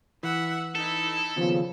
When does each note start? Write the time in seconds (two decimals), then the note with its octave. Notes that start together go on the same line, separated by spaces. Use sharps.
0.23 E3 E5 F#5
0.75 D#4 E4 A4
1.37 D#2 C#3 F3 B3